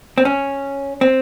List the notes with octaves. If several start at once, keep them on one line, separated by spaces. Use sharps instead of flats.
C4
C#4
C4